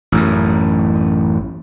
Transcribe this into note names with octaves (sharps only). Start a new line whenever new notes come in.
A1 F#2